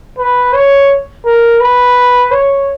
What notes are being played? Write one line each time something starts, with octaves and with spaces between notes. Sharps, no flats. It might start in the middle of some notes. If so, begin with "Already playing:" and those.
B4
C#5
A#4
B4
C#5